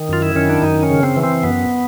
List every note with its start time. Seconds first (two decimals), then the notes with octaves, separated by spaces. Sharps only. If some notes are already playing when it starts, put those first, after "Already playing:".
Already playing: D#3
0.08 F#2 F4
0.22 E4
0.35 D#3 C#4
0.49 D4
0.62 F#2 D#4
0.83 C#4
0.90 C#3
1.03 C4
1.16 E3
1.23 C4
1.43 F#2 B3